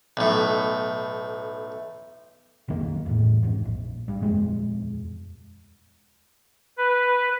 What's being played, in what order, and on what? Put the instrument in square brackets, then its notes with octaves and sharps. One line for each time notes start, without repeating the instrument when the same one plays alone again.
[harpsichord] B1 A2
[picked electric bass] B1 F2 D#3 A#3
E2 A2
F2 G#2
A#1
G2
D#1 B1 F2 G#3
[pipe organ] B4